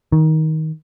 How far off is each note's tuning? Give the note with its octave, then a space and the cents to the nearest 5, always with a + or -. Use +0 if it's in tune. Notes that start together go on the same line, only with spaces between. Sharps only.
D#3 +15